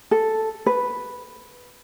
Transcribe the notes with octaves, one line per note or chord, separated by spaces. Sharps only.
A4
B4